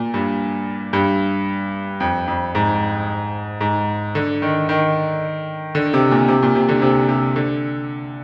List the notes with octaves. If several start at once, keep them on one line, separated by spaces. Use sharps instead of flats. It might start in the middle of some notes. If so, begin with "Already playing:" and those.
Already playing: A#2
G2
G2
F2
F2
G#2
G#2
D3
D#3
D#3
D3
C3
A#2
C3
A#2
C3
D3
C3
C3
D3